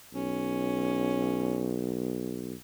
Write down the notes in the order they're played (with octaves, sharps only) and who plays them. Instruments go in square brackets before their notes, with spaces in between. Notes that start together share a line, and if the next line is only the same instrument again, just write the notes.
[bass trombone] B1 [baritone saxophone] C#4